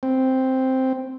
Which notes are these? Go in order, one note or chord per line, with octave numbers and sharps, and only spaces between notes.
C4